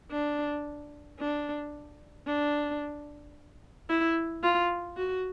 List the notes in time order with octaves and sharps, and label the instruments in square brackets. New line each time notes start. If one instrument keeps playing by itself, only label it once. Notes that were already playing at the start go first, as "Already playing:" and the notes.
[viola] D4
D4
D4
E4
F4
F#4